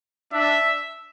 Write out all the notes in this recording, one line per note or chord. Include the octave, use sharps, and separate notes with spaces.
D4 E5